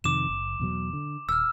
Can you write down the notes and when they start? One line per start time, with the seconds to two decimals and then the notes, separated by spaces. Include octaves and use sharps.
0.04 F2 C3 D#3 D6 E7
0.29 F#1
0.59 E2 B2 F#3
0.93 D3
1.29 D#1 E6 F6